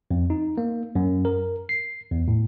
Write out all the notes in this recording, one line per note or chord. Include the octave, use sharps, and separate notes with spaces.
F2
D#4
A#3
F#2
A#4
C7
E2
A2